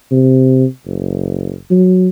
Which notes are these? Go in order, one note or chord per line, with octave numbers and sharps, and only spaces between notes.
C3
F#1
F#3